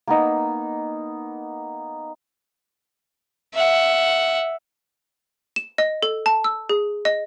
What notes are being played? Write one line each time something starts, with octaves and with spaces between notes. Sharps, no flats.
A#3 B3 D#4
E5 F#5
E7
D#5
A4
A5
E6
G#4
D#5